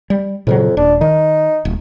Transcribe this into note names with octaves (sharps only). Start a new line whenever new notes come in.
G3
F2 A#2 C#3 F#3
D#1 D4
D#3 D#4
D#1